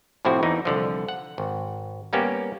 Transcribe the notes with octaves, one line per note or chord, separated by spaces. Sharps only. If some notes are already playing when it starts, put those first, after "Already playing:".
A2 C3 F3 C4 E4 F#4
E2 E3 D#4
C2 D3 F3
F#5
G#1
G3 A#3 B3 C#4 G4